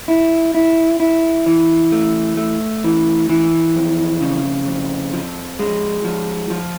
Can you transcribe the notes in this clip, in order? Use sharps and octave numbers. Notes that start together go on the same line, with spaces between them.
E4
E4
E4
E3
A3
A3
E3
E3
F2
C#3
F2
F3
G#3
F3
F3